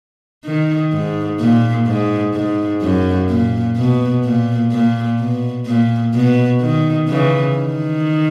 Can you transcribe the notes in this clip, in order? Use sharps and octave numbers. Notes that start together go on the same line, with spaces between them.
D#3
G#2
A#2
G#2
G#2
F#2
A#2
B2
A#2
A#2
B2
A#2
B2
D#3
C#3 E3
D#3